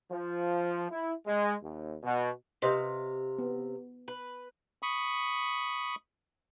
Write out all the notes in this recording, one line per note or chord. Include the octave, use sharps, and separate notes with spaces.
F3
E4
G#3
D#2
B2
C3 B4 C5 D#5 F5
B3
B4
B5 C#6 D#6